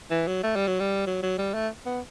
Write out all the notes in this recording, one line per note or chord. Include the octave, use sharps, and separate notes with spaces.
E3
F#3
A3
G3
F#3
G3
F#3
F#3
G3
A3
B3